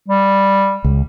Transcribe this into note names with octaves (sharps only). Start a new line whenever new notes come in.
G3
C#2